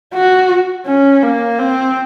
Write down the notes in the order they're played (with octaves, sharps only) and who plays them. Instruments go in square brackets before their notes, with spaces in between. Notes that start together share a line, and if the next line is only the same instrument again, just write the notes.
[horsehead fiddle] F#4
C#4
A#3
C4